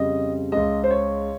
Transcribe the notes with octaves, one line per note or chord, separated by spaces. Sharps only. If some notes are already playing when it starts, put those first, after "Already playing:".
Already playing: F2 C#3 G3 D#5
C#2 C#3 G#3 D#5
C5
C#5